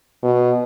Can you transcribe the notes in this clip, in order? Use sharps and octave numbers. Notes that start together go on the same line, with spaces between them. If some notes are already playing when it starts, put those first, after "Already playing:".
B2